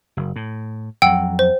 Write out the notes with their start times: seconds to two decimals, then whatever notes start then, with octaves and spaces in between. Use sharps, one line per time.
0.17 F#1
0.36 A2
1.02 F2 F#3 F#5 G5 E6
1.39 C5